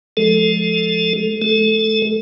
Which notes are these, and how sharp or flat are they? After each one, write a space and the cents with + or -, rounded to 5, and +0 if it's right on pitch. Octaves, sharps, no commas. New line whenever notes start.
F3 +0 G#3 +30 A4 +0
A3 -40 A4 +0